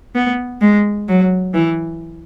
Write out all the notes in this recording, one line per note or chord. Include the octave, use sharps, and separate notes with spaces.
B3
G#3
F#3
E3